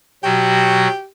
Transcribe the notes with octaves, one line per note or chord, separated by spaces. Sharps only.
B2 F#3 F#4 G4